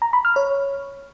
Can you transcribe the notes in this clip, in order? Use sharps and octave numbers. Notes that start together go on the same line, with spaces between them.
A#5
B5
F6
C#5